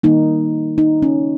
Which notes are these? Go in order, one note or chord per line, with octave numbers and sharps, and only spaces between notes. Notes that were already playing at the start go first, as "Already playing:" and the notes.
D#3 G3 A#3 D#4
D#4
C#4